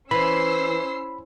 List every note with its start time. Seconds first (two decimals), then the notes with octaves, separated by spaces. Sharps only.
0.11 E3 C#4 C5 B5 E6 C7